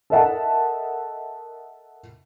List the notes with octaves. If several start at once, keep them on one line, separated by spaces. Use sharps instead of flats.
A4 A#4 D#5 E5 F#5 A5